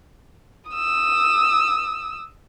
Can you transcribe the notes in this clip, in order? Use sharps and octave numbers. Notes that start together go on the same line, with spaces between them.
D#6 E6